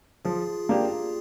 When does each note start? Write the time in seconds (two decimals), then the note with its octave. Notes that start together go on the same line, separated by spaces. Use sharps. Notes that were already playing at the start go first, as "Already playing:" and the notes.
0.25 F3 F4 G#4
0.69 A#3 D4 G4